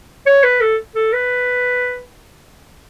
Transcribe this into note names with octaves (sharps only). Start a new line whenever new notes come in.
C#5
B4
A4
A4
B4